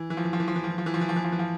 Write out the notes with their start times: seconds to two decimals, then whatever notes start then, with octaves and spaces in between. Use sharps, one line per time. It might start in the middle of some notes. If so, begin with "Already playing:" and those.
Already playing: E3
0.10 E3
0.17 F3
0.25 E3
0.33 F3
0.40 E3
0.48 F3
0.56 E3
0.64 F3
0.70 E3
0.78 F3
0.86 E3
0.94 F3
1.01 E3
1.09 F3
1.16 E3
1.24 F3
1.32 E3
1.39 F3